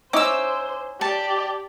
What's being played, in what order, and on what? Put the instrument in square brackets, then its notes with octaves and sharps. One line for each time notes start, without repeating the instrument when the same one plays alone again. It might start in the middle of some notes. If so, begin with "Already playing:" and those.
[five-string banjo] C#4 D#4 E4 [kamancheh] C5 [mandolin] D6 E6
[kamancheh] G4 D5 [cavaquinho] A5